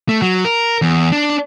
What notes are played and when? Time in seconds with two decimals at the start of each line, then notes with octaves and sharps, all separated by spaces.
0.09 A3
0.22 F#3
0.45 A#4
0.82 E2
1.12 D4